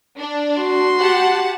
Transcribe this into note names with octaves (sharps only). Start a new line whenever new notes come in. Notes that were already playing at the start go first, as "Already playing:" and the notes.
D4
F#4 C6
G4 F#5 A5